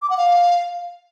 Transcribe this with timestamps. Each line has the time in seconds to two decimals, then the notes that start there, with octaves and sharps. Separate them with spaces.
0.02 D6
0.10 F#5
0.18 F5